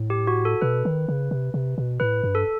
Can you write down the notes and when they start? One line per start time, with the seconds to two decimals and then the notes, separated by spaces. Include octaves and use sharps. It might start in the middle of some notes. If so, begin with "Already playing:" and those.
Already playing: A2
0.10 G4
0.27 F#4
0.45 A4
0.61 B2 B4
0.85 D#3
1.08 C#3
1.31 C3
1.54 C3
1.78 B2
2.00 A2 B4
2.24 G2
2.35 A4